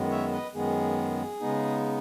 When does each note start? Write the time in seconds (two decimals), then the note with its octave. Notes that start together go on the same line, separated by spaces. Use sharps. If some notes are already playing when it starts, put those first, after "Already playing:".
Already playing: F#2 D#3 G#3 B3
0.10 C#5 E5
0.32 B4 D#5
0.54 F#2 D#3 G#3 B3 G#4
1.40 C#3 G#3 B3 D#4